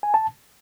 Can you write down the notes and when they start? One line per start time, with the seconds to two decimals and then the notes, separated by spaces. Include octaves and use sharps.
0.03 G#5
0.14 A5